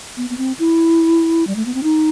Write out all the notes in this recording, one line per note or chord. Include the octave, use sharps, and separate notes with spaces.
B3
B3
C4
E4
G3
A3
B3
C4
D#4